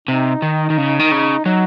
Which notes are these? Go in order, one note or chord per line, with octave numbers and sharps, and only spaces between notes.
C3 D#4
D#3
D#3
C#3
D#3
C#3
F#3 D#4